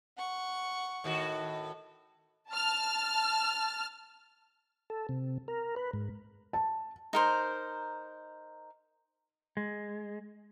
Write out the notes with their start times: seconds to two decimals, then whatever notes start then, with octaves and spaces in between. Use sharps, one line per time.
0.18 F#5 C#6
1.04 A2 D#3 F#4
2.51 A5 F6
4.90 A4
5.09 C3
5.48 A#4
5.76 B4
5.93 G#2
6.53 A5
7.13 D#4 A#4 C5
9.57 G#3